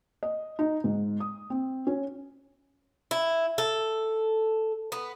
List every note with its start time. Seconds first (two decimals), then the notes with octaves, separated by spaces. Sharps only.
0.23 D#5
0.59 D#4
0.84 G#2
1.20 D#6
1.50 C4
1.87 C#4
3.11 E4
3.58 A4
4.92 B3